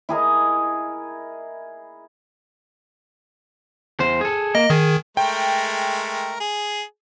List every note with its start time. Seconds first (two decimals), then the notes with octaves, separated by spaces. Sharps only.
0.09 E4 G#4 A#4 D#5
4.00 E2 C5
4.21 G#4 A4
4.55 A#3 D#5
4.70 D#3 G#4
5.17 G#3 A3 A#4 G5
6.40 G#4